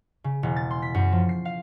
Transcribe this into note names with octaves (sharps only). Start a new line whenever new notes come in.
C#3
E1
A6
C6
B6
F#2
F3
C7
F5